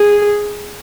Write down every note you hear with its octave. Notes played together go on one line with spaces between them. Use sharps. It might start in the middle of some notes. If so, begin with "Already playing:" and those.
Already playing: G#4